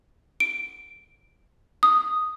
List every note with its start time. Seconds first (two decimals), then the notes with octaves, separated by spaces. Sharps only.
0.40 D7
1.83 D#6